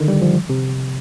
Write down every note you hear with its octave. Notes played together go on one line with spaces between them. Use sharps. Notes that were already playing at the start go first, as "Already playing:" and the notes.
Already playing: D3 D#3
G3
F3
C3